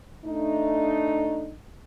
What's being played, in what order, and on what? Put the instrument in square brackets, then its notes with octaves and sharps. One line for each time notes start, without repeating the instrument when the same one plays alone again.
[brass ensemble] A3 D4 D#4